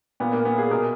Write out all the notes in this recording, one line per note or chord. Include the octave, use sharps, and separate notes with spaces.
A#2 B3
A#3
B3
G#4
B2 A#4